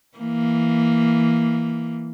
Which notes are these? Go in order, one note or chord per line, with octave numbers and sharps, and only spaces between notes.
E3 A#3